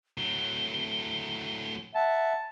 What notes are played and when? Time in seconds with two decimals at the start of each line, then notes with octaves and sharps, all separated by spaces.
0.18 A2 F#3 G7
1.95 E5 F#5 A5